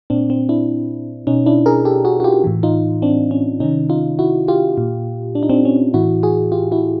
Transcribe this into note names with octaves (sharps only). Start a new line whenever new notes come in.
A#2 C4 D4
C4
D4 E4
B2 C#4 D#4
D4 E4
G#4 A#4
G4 A4
F#4 G#4
F#4
F4 G4
A2 E3
D#4 F4
C4 D4
C#4
C3 D#3 C#4 D#4
D#4 F4
E4 F#4
F4 G4
A#2
D4
D#4
C4 D4
C#4
A2 E3 E4 F#4
F#4 G#4
F4 G4
E4 F#4